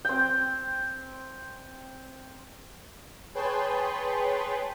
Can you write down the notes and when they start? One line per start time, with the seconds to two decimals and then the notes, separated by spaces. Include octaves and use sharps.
0.05 C4 G5
3.34 G#4 B4 C#5 G5 A5 C6